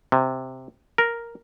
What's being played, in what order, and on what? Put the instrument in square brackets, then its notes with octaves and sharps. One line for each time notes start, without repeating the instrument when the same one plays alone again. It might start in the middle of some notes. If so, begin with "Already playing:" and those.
[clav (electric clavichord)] C3
A#4